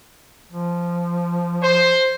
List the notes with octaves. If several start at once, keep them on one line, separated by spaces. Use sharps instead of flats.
F3
C5